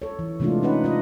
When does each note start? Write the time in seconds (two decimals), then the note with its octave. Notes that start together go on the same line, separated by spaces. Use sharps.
0.02 A4 C#5
0.19 E3
0.40 C3 E3 G#3 A3 D4 F4
0.63 C#4 D#4 B4 F#5
0.84 D4 F4 D#5